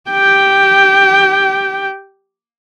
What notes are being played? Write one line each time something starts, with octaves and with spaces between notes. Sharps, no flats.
G4 G5